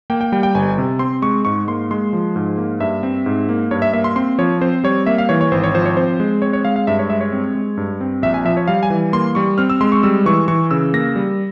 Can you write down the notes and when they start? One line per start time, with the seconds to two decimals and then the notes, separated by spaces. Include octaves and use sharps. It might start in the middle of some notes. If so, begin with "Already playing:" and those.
0.10 A#3 G5
0.21 G5
0.32 G3 G5
0.43 G5
0.55 G1 G#5
0.78 C3
0.99 C4 C6
1.22 G#3 C#6
1.45 G#2 C#6
1.68 A#3 C6
1.91 G#3 C6
2.13 F3
2.36 G#2
2.58 A#3
2.80 G2 E5
3.03 C4
3.26 G#2
3.49 A#3
3.71 G2 C#5
3.82 E5
3.93 A#3 E5
4.04 C6
4.16 C4 C6
4.38 F3 C#5
4.61 C4 C5
4.84 G3 C#5
5.06 A#3 E5
5.18 F5
5.29 E3 C#5
5.41 C#5
5.52 G#1 C5
5.64 C#5
5.74 F3 C5
5.86 C#5
5.97 C4 C5
6.20 G#3
6.42 C4 C#5
6.53 C#5
6.65 G#3 F5
6.76 F5
6.87 G2 E5
6.99 C#5
7.10 G#3 E5
7.21 C#5
7.32 C4
7.55 G#3
7.77 G2
8.01 C4
8.22 A#1 E5
8.34 G#5
8.45 F3 E5
8.57 C#5
8.68 G3 F5
8.83 G#5
8.90 E3
9.13 A#3 C6
9.35 G3 C#6
9.58 C4 F6
9.70 E6
9.81 G#3 C6
9.92 C#6
10.03 G3 E6
10.26 E3 C#6
10.48 E3 C#6
10.71 C#3 E6
10.94 A#3 A#6
11.16 G3